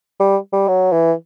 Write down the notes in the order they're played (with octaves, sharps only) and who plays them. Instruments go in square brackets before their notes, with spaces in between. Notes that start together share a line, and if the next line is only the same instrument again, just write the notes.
[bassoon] G3
G3
F#3
E3